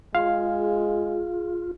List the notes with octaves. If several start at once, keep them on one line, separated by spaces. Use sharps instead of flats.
G#3 F4 G#4 F5